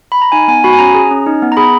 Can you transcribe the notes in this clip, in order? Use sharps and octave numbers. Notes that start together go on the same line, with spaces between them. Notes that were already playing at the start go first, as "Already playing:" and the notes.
B5
A#5
D#4 G#5
B3 G#5
F#4 B5
G#5
C#4 A#5
G#4
C#4
D#4
B3
A#5
G#4 B5